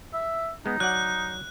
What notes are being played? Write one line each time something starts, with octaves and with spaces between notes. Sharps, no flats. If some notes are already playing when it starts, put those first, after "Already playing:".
E5
G#3 B3 D#4
F#3 D5 F#5 F#6